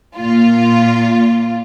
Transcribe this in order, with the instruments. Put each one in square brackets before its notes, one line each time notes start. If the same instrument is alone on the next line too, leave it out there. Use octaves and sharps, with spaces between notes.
[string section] A#2 F4